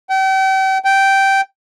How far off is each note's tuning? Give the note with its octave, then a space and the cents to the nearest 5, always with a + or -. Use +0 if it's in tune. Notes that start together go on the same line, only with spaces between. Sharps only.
G5 -40
G5 -10